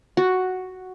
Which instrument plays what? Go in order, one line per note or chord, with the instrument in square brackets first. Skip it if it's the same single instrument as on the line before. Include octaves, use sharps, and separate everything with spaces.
[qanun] F#4